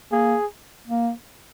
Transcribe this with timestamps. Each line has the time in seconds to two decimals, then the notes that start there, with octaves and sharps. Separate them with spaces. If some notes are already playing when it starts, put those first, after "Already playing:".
0.12 A#3 G#4
0.88 A#3